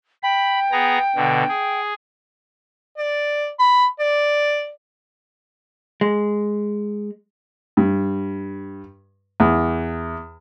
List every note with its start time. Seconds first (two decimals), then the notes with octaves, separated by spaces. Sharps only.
0.23 G5 B5
0.72 B3 G#4 A#5
1.16 B2 D3
1.49 G#4
2.98 D5
3.59 B5
4.00 D5
6.01 G#3
7.77 G2
9.40 E2